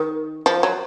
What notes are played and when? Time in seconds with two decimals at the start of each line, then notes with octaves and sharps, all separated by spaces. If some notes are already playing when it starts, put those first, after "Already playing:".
Already playing: D#3
0.46 F3
0.63 F#3